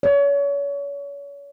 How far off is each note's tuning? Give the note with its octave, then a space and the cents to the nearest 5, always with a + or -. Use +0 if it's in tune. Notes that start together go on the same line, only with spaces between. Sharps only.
C#5 +35